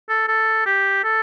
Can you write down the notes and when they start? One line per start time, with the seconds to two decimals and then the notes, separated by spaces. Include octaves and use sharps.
0.09 A4
0.28 A4
0.66 G4
1.04 A4